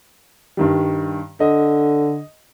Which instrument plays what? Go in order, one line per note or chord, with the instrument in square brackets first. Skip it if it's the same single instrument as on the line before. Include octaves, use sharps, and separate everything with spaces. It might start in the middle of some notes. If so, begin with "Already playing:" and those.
[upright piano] G2 D#3 G3
[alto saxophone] D3 [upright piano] D#5